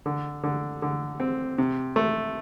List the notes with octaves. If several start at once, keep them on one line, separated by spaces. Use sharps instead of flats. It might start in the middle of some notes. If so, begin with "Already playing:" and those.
D3
D3
D3
C4
C3
A3